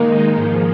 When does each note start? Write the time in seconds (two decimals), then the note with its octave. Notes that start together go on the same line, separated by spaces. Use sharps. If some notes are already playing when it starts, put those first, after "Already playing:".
Already playing: D#3 G#3 A#3 D#4
0.36 G#2 F3 G#3